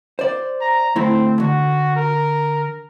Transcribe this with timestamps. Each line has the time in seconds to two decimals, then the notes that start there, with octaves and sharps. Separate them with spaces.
0.19 C5 D5
0.61 A#5
0.96 D2 A3 C4 E4
1.40 D3 F#4
1.96 A#4